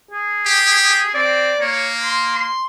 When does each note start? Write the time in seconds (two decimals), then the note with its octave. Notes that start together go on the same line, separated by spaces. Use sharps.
0.11 G#4
0.46 G4
1.14 C4 D5
1.61 A#3 C#5
2.02 C6
2.34 C6